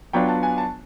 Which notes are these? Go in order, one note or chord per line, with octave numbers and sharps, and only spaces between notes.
F#3 B3 D4 F4 G5
A5
G#5
A5